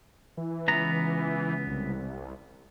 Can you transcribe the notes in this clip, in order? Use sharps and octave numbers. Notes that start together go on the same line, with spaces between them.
E3
C#2 B3 A#5
C2